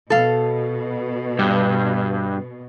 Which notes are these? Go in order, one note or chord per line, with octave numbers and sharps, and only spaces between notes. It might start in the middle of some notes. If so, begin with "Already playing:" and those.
B2 A4 F5
G2